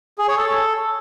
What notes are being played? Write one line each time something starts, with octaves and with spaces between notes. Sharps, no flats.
G#4
C#5
A4